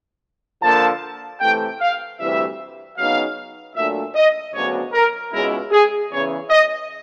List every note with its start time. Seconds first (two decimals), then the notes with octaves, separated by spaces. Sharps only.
0.63 D3 F3 A#3 A5
1.41 C3 E3 A3 G5
1.80 F5
2.19 D2 C3 E3 G3 E5
2.98 C#3 F#3 B3 D#4 F5
3.76 A#2 F#3 A3 D4 E5
4.15 D#5
4.54 D2 C#3 F#3 B3 D4 C#5
4.94 A#4
5.32 C#2 B2 G#3 C#4 E4 A#4
5.72 G#4
6.11 E2 C#3 E3 C#5
6.50 D#5